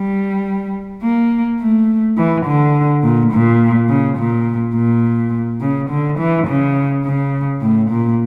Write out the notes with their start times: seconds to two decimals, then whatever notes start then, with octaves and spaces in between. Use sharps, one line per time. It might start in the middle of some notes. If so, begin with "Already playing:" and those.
Already playing: G3
1.03 A#3
1.60 A3
2.17 E3
2.46 D3
3.03 A#2
3.32 A#2
3.89 C#3
4.18 A#2
4.75 A#2
5.61 C#3
5.90 D3
6.19 E3
6.47 C#3
7.04 C#3
7.61 A2
7.90 A#2